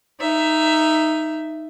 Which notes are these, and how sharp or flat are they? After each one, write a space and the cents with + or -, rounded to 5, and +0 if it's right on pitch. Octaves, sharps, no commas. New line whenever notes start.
D#4 +0 E5 +10